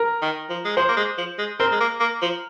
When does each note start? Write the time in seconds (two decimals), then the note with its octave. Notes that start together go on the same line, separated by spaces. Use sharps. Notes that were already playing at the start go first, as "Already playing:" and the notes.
Already playing: A#4
0.22 D#3
0.49 F3
0.65 G#3
0.77 F3 C5
0.89 A#3
0.97 G#3
1.18 F3
1.39 G#3
1.60 C4 A#4
1.71 G#3
1.80 A#3
2.00 A#3
2.22 F3